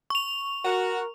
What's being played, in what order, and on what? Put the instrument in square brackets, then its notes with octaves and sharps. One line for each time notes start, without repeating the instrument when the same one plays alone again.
[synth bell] C#6 F7
[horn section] F#4 [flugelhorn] A#4